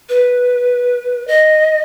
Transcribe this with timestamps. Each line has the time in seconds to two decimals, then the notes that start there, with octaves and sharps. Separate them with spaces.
0.09 B4
1.28 D#5